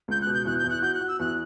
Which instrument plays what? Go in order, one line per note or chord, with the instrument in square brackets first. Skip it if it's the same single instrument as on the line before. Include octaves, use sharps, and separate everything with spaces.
[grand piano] C#2 [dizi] G6
[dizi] F#6
[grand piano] B2
[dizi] G6
[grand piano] E2 [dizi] F#6
[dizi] G6
[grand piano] E2
[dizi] F#6
[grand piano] F#4 [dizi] G6
[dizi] F#6
[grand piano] F#4
[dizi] E6
[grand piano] E2 [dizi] F#6